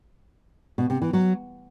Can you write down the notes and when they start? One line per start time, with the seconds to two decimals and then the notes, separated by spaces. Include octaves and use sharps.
0.78 B2
0.90 C3
1.02 E3
1.13 F#3